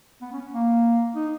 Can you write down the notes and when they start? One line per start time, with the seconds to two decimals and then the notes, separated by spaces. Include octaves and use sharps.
0.21 B3
0.32 C#4
0.53 A#3
1.16 D#4